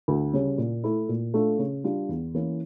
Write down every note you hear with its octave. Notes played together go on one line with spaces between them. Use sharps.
D2
C#3 G3 C#4
A#2
A3 E4
A#2
A3 D4 F4
C#3
G3 D4 F4
E2
E3 A#3 C#4